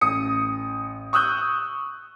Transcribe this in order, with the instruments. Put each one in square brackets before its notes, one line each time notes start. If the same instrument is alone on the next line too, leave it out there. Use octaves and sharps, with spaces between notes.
[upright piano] A1 D#6 C#7
C#6 D#6 E6 F#6 G6